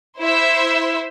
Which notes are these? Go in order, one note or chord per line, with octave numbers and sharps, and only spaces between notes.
E4 C5 E5